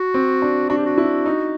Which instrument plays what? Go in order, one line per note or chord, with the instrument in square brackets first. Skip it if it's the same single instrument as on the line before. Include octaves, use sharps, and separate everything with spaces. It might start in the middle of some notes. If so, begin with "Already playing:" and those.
Already playing: [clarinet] F#4
[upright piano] C4
D4
[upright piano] D4 [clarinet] F#4
[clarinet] G4
F#4
[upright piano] E4
D#4